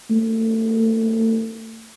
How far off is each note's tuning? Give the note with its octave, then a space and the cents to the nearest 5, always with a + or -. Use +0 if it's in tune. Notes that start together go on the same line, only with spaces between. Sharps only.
A3 +30